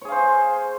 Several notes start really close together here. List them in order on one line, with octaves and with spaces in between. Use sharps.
C#5 G#4 F5 C5